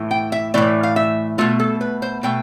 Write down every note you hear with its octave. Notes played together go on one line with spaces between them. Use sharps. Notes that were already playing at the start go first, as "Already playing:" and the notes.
Already playing: A2 E3 A3
G5
E5
A2 E3 A3 D5
F5
E5
B2 A3 F4
A4
B4
C5
B2 A3 G5